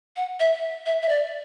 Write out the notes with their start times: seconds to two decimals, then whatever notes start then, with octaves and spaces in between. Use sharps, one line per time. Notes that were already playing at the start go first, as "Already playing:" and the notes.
0.16 F#5
0.40 E5
0.86 E5
1.02 E5
1.09 D5